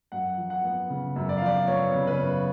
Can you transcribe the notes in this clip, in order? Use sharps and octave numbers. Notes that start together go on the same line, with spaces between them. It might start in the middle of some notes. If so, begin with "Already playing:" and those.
F#2 F#5
F3
F#5
B3
C#3
F#2
D5
F5
F3 D5
B3 C#5
C#3
B4
F#2